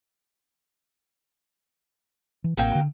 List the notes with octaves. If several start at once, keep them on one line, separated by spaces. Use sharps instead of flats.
E3
A1 F#3 A#3 C4 G5
D3